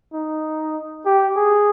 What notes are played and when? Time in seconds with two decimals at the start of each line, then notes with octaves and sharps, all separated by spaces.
0.13 D#4
1.06 G4
1.36 G#4